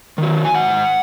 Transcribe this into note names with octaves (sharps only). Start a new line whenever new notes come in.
D#3 F#3
G#5
G#2 F#5